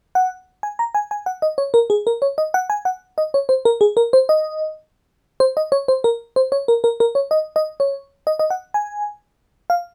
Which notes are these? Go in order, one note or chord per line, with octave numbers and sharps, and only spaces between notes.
F#5
G#5
A#5
G#5
G#5
F#5
D#5
C#5
A#4
G#4
A#4
C#5
D#5
F#5
G#5
F#5
D#5
C#5
C5
A#4
G#4
A#4
C5
D#5
C5
D#5
C#5
C5
A#4
C5
C#5
A#4
A#4
A#4
C#5
D#5
D#5
C#5
D#5
D#5
F#5
G#5
F5